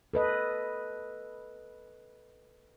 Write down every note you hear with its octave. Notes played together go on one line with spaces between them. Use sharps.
A4 B4 D#5